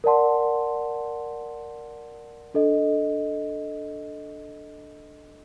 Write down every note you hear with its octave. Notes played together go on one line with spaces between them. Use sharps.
A#4 D5 F#5 A5 C6
D4 A4 D#5